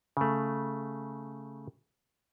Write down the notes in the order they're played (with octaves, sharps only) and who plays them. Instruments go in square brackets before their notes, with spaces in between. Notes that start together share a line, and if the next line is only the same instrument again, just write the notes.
[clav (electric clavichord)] C#3 A3